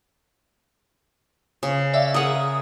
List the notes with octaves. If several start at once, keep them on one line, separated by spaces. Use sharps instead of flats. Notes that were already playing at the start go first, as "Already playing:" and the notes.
C#3
D5 E5 F5
G#4 A#4 F#5 D#6